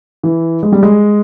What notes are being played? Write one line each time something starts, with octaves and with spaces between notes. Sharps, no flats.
E3
G#3
G3
G#3